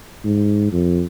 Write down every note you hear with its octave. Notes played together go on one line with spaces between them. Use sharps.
G#2
F2